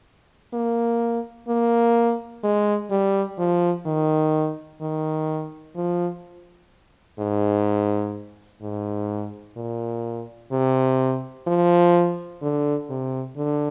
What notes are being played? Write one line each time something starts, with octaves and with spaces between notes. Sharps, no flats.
A#3
A#3
G#3
G3
F3
D#3
D#3
F3
G#2
G#2
A#2
C3
F3
D3
C3
D3